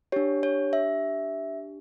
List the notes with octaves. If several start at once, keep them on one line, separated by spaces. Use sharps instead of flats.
D4 G4 C#5
C#5
E5